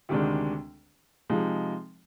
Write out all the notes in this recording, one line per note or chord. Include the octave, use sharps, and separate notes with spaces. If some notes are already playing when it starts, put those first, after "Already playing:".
D2 C3 D#3 G#3 D4
C3 F3 G#3 D#4